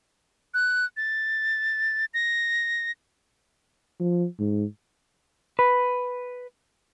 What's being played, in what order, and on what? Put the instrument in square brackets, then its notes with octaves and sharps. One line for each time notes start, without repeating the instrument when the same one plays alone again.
[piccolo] F#6
A6
A#6
[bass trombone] F3
G#2
[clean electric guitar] B4